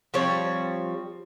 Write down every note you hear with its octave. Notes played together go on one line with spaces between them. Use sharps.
F3 G3 C4 C#5